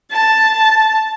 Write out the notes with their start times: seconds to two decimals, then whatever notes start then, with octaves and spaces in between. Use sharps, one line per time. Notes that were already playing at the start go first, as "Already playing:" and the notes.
0.10 A5